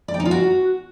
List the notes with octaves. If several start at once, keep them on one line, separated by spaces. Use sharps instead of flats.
D5
G5
D#4
F4
F#4